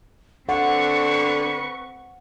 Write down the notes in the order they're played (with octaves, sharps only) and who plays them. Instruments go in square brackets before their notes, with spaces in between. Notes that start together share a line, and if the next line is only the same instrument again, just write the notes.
[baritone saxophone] D3 [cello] C4 B4 [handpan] F#5 [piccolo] C#6